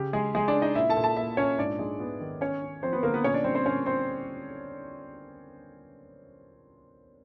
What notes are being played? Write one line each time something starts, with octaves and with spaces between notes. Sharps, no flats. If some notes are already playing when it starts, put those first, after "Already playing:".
Already playing: C#3 G4
G#3 G#4
G#3 G#4
D4 D5
C#4
D#4 D#5
A#2 E4 E5
A4 A5
A#2
A4 A5
A#2 E4 E5
A#2 C#4 C#5
G#2 D4 D5
G#3
B3
D#3
C#4 C#5
C#4
F3 C4 C5
B3 B4
D3 A#3 A#4
B3 B4
A#2 C#4 C#5
D4 D5
G3 C4 C5
C4 C5
A#2 C#4 C#5
C4 C5